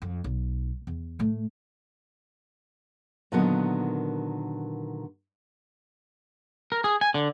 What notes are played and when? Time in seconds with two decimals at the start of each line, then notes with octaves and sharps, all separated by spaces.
0.02 F2
0.24 B1
0.87 E2
1.19 A2 A3
3.32 A#2 D3 D#3 F#3 B3
6.72 A#4
6.84 G#4
7.01 G#5
7.14 D3